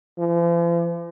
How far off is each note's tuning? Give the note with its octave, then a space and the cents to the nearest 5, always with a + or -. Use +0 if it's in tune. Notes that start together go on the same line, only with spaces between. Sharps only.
F3 -45